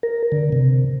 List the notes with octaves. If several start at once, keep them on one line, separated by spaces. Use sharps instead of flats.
A#4
D3
C3